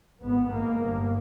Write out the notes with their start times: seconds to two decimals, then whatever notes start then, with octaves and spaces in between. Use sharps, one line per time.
0.24 G#1 G2 B3
0.52 G#1 G#2 A#3
0.80 G1 G2